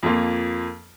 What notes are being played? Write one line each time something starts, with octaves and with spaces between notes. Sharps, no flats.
F2 F3 A#3 F4